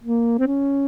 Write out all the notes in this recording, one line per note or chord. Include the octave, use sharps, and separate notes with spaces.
A#3
C4
C#4